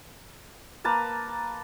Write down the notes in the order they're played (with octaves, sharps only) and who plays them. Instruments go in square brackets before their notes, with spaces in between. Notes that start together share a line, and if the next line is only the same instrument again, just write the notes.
[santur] A#3 B4 A5 A#5